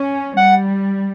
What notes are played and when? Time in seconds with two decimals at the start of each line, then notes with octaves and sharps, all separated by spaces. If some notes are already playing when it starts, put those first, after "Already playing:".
Already playing: C#4
0.37 G3 F#5